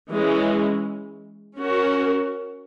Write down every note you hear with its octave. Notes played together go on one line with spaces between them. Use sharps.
E3 G#3 C#4
C#4 F#4 A#4